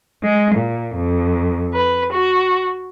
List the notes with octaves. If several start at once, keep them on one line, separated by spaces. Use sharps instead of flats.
G#3
A#2
F2
B4
F#4